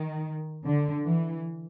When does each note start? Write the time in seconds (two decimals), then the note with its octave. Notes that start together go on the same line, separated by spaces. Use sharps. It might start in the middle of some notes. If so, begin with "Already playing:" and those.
Already playing: D#3
0.65 D3
1.06 E3